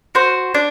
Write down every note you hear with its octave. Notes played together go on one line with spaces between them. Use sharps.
F#4 C5
D4